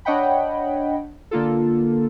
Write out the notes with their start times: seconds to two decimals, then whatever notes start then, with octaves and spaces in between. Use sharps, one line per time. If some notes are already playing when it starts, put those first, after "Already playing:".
0.05 D4 C#5 D#5 F#5 G5 B5
1.31 D3 A#3 F4 A4